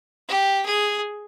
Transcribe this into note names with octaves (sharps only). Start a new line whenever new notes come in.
G4
G#4